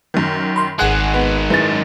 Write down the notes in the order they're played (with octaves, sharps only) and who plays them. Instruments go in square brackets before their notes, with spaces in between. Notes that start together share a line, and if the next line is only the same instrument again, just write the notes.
[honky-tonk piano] F#2 D#3
[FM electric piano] B5 C6
[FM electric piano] G#1 F#5 F#6 [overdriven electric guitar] D#3 G#3 [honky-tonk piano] G#4
[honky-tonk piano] B3
[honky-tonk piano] F#2 A6 [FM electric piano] E4 G#4 B4